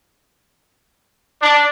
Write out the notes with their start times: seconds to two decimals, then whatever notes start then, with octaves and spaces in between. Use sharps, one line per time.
1.41 D4